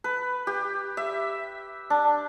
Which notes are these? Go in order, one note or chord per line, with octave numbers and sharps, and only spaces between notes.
B4
G4
E5
D4